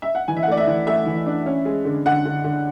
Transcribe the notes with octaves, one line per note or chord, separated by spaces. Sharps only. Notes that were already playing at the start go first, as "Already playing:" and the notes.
E5
F#5
E3 G#5
E5
F#5
A3 D5
E5
E3
A3 E5
E3
D4
C#4
G#3
D3
D3 F#5
D3
D3